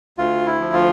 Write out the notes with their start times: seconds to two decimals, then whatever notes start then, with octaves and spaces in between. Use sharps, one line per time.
0.18 D2 F4
0.46 E4
0.60 F3
0.73 F4